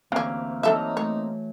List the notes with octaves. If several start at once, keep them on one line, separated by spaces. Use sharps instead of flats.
D2 E3 G3 A#3 C4 C#4 F5 C#6
E3 F#3 A3 D#4 A4 E5
A3 C#5